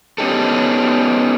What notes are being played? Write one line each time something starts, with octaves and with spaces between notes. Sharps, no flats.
B3 C#4 D#4 G4 A4